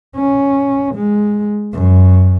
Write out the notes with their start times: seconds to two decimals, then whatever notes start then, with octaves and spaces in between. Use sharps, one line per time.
0.15 C#4
0.95 G#3
1.73 F#2